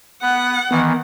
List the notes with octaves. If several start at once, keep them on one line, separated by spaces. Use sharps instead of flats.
B3 F#5
D#3 E3 B3